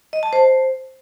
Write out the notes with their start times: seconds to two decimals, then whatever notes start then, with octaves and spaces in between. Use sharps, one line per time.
0.13 D#5
0.23 A5
0.33 C5